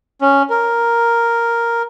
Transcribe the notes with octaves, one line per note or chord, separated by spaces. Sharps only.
C#4
A#4